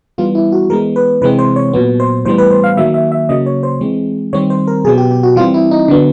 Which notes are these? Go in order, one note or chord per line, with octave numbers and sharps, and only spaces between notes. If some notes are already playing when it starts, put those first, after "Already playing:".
E3 G3 B3 F4
E4
F#4
E3 G#3 B3 A#4
B4
C3 E3 G#3 C4 B4
C5
C#5
A#2 F#3 B3
C5
A2 E3 G3 B3 C5
B4
C5
F5
D#3 F#3 A#3 E5
E5
E5
C#3 F#3 A#3 D#5
C#5
C5
E3 G#3 C4
D#3 G3 C4 C#5
C5
A#4
B2 F#3 B3 G#4
G4
G4
F#4
E3 G3 C4 F4
E4
D#4
D3 F#3 B3 D4